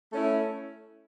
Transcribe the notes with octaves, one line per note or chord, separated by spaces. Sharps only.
A3 C#4 E4